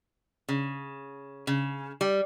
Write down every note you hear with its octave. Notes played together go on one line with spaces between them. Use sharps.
C#3
C#3
G3